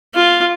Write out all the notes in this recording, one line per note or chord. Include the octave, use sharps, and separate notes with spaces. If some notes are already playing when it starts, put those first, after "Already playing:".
F4